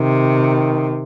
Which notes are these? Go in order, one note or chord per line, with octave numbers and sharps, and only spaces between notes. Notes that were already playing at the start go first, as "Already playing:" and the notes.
Already playing: C3 D#3